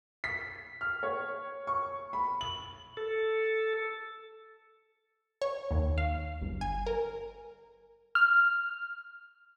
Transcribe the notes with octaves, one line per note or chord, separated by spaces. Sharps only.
B6
F6
C#5
C#6
B5
F#7
A4
C#5
D#2
F5
G1
G#5
A#4
F6